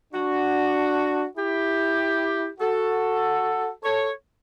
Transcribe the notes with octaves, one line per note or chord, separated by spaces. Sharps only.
D4 F#4
E4 G4
F#4 A4
A4 C#5